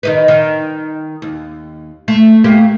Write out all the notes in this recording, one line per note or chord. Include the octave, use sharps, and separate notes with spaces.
D#3 D#4 B4
D#3
D#2
A3
A3 A#3 G4